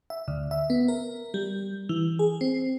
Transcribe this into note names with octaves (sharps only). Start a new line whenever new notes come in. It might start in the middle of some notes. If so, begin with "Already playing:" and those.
E5
D2
E5
B3
A#4
G3
E3
G#4
C4